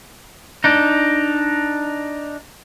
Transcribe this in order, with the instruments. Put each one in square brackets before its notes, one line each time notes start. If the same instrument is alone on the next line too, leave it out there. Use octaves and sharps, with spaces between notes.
[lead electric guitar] D4 D#4